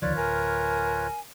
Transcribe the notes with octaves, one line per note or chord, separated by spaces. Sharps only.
D2 D#3 F3 F4 B4 C#5 D5
D1 A#4 G#5